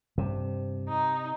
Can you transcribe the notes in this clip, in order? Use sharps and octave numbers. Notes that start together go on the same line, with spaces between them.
G2 C3
D#4